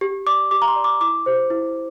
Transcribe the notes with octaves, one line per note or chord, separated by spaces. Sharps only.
G4
D5 D6
G4 D6
A#5
C6
D5
D6
E4 D6
G4 C5
E4